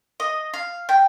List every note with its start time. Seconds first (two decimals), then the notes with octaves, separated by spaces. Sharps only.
0.20 D#5
0.54 F5
0.89 G5